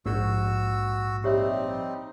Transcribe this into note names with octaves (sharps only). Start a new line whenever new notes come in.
A#1 G#2 F#4 E6
G3 C4 D#4 G4 C#5 E5